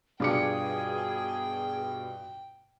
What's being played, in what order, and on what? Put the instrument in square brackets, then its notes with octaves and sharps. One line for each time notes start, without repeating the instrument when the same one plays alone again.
[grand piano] G2 B2 F4 [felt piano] D4 D6 C#7 [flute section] G#4 [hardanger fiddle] G5